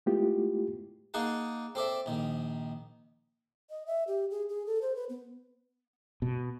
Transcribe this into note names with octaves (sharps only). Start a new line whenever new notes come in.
G#3 A3 B3 E4 F4 G4
A#3 D#4 G#4 F#5 A5
C4 A4 D5 E5
A#1 D#3
D#5
E5
G4
G#4
G#4
A4
C5
B4
B3
B2